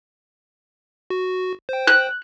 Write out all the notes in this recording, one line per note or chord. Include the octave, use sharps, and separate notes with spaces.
F#4
C5 G5
F#6